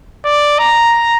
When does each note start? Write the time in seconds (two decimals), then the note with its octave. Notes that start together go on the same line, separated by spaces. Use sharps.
0.24 D5
0.59 A#5